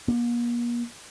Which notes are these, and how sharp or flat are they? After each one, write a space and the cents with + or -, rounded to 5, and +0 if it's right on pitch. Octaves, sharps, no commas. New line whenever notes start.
A#3 +40